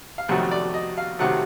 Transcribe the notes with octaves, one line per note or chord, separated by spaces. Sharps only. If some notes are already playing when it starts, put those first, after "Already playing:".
F5
F2 C3 D#3 F#3 A3 F#5
D5
D#5
F5
C3 D#3 F#3 A3 F#5